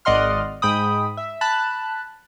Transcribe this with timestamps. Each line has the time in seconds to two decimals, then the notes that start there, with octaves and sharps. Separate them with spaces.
0.05 G#1 D5 D#5 F#5 C6 F6
0.62 G#2 G5 B5 D#6
1.17 E5
1.41 A5 B5 F#6